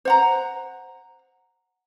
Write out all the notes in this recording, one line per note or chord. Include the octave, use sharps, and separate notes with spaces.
C5 F#5 A#5